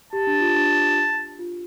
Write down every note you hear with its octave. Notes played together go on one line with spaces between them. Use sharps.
G4 A5
D4
F4
D4
F4